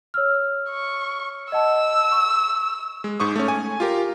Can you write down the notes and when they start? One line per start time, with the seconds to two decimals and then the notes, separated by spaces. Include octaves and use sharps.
0.14 C#5 E6 F6
0.69 C#6
1.52 D#5 F#5 A5 E6
2.12 C#6
3.04 G#3
3.20 G#2 C#6 D#6
3.36 A3 C#4
3.48 G#5
3.80 F4 G4 A#4